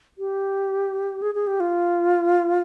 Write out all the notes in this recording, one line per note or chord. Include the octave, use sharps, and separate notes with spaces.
G4
G#4
G#4
G4
F4